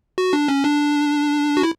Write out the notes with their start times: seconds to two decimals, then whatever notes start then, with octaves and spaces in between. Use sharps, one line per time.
0.18 F#4
0.33 D4
0.48 C#4
0.64 D4
1.57 F#4
1.63 E4